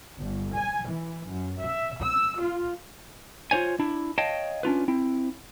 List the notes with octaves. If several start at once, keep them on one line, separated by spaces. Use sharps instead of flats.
G1
G#5
E3
F#2
E5
E6
F4
F4 F#4 C5 C#5 G#5
D4 E4
C#5 D#5 F5 G5 A5
C#4 D4 F4 B4
C4 E4